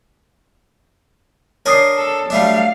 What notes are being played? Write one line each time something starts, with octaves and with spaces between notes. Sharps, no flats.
D4 A#4 C#5 G#5 D#6 C7
A4
F#3 G3 A3 D4 F5